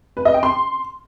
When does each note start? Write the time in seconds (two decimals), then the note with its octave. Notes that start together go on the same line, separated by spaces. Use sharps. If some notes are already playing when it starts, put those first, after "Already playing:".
0.17 B4
0.25 D#5
0.34 G5
0.43 C6